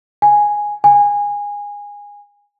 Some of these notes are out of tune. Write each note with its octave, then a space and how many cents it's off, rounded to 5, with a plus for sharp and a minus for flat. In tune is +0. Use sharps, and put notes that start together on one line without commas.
G#5 +0
G#5 -20